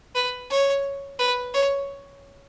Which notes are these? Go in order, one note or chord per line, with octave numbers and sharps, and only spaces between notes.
B4
C#5
B4
C#5